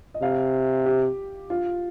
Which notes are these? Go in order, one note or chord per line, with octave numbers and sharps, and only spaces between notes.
D#5
C3 F5
G4
F4